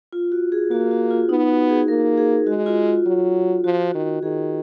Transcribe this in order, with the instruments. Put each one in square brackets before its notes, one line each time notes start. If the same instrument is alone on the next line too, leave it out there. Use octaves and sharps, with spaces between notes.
[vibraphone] F4
F#4
G#4
[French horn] A#3 [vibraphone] F#4
[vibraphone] F#4
F4
[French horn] B3 [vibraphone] D#4
[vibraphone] F#4
G#4
[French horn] A#3 [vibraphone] A#4
[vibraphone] G#4
[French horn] G#3 [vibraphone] F#4
[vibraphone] F4
F4
[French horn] F#3
[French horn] F3 [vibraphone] F#4
[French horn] D#3 [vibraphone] F#4
[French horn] D#3 [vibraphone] G#4